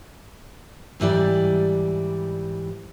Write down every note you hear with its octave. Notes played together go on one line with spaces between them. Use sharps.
G#2 E3 G3 D5